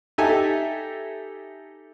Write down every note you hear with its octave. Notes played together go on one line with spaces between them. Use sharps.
D#4 G4 A4 E5 G#5